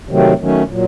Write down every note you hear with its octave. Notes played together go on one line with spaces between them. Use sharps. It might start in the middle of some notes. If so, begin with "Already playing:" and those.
C3 D#3 F#3 A3 C4
D#3 F#3 A3 C#4
A#2 F#3